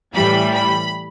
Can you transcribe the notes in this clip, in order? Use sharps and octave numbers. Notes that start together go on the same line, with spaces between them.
A2 E3 G3 B5
B5